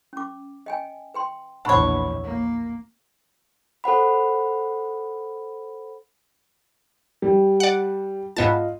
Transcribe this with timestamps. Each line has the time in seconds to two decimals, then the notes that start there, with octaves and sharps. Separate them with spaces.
0.13 C#4 D6
0.66 D#5 G5 G#5
1.14 B4 G5 C6
1.65 A#1 E2 D4 C#5 F#5 B5 C#6
2.24 A#3
3.84 A4 C5 F#5 B5
7.22 G3
7.60 D5 F#5
8.37 G#2 B3 F4 D#5 A5